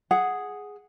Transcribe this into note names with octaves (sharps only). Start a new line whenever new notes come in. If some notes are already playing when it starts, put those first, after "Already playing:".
G#4 F#5